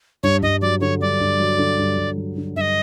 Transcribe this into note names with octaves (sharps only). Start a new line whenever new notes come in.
G2 C#5
G2 D#5
F#3 D5
D3 C#5
G2 D5
G2
F#3
D3
G2
G2
F#3
D3
G2 D#5 E5